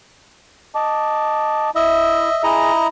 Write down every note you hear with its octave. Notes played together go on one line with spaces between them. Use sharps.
D#5 A5 D6
E4 D#5 E5
E4 G#4 D#5 A#5